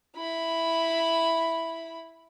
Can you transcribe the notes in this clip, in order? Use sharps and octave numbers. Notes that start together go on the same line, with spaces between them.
E4 B5